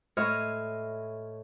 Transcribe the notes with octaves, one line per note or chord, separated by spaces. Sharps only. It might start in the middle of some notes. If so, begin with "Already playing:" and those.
A2 C#5 D#5 E5 C6 F6